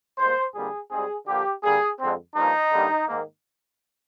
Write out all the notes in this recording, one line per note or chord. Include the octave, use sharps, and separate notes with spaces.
G#2 G3 A#3 C5
F2 D3 G3 A#3 G#4
G#2 G3 C4 G#4
D3 F3 A#3 G4
D3 G3 A#3 G#4
F2 D3 G#3 C4
G2 F3 A#3 D#4
G2 D3 G3 A#3
G#2 D#3 A#3